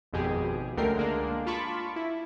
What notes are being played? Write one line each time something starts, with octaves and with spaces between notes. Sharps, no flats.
G#1 F2 B2 G4 G#4
C#2 D3 A3 A#4 G5 C7
G#3 A#3 D4
F4 A5 B5 C#6 D6
E4